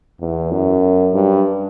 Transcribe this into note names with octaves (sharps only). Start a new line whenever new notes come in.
E2
F#2
G2